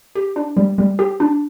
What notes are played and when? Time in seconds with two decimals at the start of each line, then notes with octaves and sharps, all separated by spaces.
0.15 G4
0.36 D4
0.57 G3
0.78 G3
0.99 G4
1.20 D4